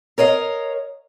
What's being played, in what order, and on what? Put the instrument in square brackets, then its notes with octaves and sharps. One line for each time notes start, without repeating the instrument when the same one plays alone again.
[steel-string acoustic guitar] A#4 C#5 D#5 F5